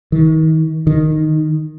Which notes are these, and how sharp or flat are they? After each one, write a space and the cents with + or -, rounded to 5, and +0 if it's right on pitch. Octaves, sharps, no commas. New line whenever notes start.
D#3 +35
D#3 -5